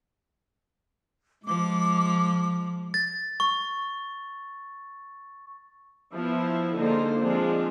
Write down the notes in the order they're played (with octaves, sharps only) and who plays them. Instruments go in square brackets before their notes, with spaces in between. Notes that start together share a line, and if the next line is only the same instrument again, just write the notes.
[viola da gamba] F3 G#3 [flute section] D6
[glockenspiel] A6
C#6
[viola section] F3 B3 E4
D3 G#3 A#3 D#4 F4 C5
F3 G#3 C4 D4 F4